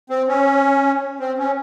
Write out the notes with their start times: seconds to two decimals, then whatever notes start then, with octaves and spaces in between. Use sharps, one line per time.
0.10 C4
0.28 C#4
1.20 C4
1.39 C#4